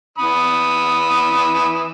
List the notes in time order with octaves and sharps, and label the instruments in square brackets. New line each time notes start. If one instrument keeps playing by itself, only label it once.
[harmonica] E3 B5 D#6